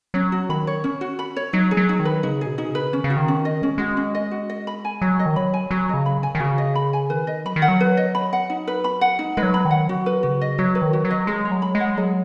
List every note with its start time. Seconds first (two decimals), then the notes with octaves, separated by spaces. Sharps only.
0.14 F#3 C#4
0.32 F#4
0.49 D#3 B5
0.67 C#5
0.84 C#4
1.01 F#4
1.19 B5
1.36 C#5
1.53 F#3 D#4
1.71 G#4
1.77 F#3
1.89 D#4
2.00 D#3
2.05 B4
2.23 C#3 D#4
2.41 B2 G#4
2.58 D#4
2.70 C#3 B4
2.92 D#3 C#4
3.04 C#3
3.10 F#4
3.16 D#3
3.28 C#4
3.45 D#5
3.62 G#3 C#4
3.78 G#3 F#4
3.97 C#4
4.15 D#5
4.31 F#4
4.50 D#5
4.67 B5
4.85 G#5
5.02 F#3 F#4
5.19 D#5
5.26 D#3
5.36 F#3 B5
5.54 G#5
5.71 F#3 F#4
5.89 C#3 D#5
6.06 B5
6.23 G#5
6.35 D#3
6.40 C#3 F#4
6.58 D#5
6.76 B5
6.93 G#5
7.10 D#3 B4
7.27 D#5
7.45 F#3 B5
7.56 D#3
7.62 F#5
7.68 F#3
7.81 B4
7.97 D#5
8.15 B5
8.33 F#5
8.50 D#4
8.67 B4
8.84 B5
9.01 F#5
9.19 G#3 D#4
9.37 G#3 B4
9.43 F#3
9.54 B5
9.65 D#3
9.71 F#5
9.88 F#3 F#4
10.06 B4
10.23 C#3 F#4
10.41 D#5
10.58 F#3 F#4
10.75 B4
10.82 D#3
10.93 F#4
11.05 F#3
11.11 D#5
11.27 G#3 G#4
11.45 C#5
11.52 F#3
11.62 B5
11.75 G#3
11.80 F#5
11.97 F#3 G#4